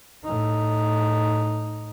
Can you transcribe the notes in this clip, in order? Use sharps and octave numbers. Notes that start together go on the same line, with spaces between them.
A2 D#4